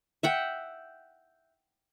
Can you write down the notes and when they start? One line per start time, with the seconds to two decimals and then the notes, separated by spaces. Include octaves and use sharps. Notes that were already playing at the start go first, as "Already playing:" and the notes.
0.23 E5 F#5 G5